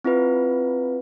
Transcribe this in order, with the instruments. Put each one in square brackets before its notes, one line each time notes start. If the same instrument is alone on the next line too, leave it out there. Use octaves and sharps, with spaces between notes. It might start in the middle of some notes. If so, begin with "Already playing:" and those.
[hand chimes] C4 E4 F4 B4